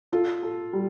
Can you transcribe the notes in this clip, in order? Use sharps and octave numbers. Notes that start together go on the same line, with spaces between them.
F4 A4
A4
G3